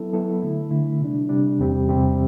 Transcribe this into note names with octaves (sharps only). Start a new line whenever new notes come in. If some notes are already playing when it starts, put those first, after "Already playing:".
Already playing: F#3 B3 E4 A4
F#3 B3 E4 A4
D3 A3 E4
D3 A3 E4
C3 G3 D4
C3 G3 D4
E2 C3 G3 C4 G4
E2 C3 G3 C4 G4